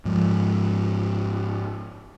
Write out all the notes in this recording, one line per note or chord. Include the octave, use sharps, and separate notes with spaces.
G#2 F3